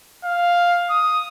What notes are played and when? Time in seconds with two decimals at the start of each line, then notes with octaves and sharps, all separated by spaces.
0.24 F5
0.90 D#6